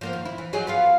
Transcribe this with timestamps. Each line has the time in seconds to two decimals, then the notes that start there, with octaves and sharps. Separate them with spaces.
0.01 F3 A#3 B3
0.13 D#3
0.25 E4
0.38 E3
0.53 F#3 D#4 G#4
0.67 B3 F4 F5